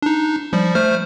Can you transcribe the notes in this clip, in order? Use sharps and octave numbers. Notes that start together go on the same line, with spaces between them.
D4 D#4
F3 G3
A3 C5 F6